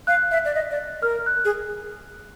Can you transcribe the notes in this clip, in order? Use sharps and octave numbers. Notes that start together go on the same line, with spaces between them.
F5 F#6
E5
D5
D#5
D5
A#4 F6
F#6
G#4